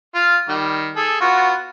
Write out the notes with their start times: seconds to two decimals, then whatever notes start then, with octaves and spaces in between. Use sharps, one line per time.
0.15 F4 F5
0.49 D#3 G3
0.96 G#4 A4
1.21 B3 F4 F#4